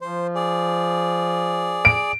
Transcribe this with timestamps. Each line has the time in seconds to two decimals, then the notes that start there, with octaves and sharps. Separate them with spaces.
0.01 F3 C5
0.35 G#4 D5
1.85 D7